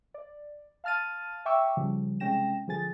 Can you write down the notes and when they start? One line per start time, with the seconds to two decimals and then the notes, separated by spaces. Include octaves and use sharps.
0.14 D5
0.84 F5 A5 F6 A6 D#7
1.46 E5 G5 C#6 D6 E6
1.77 C#3 F3 G3
2.20 C3 G#3 C#4 G5 A#6 E7
2.67 D3 F3 G#4 G#5 A6